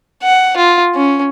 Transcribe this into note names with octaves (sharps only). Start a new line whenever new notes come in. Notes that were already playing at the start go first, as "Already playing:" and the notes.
F#5
F4
C#4